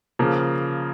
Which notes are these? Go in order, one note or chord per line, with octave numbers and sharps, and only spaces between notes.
C#3 F3 A#3